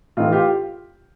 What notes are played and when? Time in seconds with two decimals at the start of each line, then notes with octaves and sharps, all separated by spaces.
0.17 A2 E3 D#4 F4
0.32 F4 G4